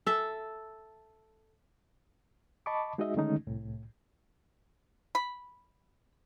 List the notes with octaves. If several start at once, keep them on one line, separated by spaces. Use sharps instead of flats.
A4 E5
D#5 A5 B5 C#6 D6
G#3 D#4 F#4 G#4 D#5 E5
D3 D#3 G#3 A3 C#4 D#4
C2 A2
B5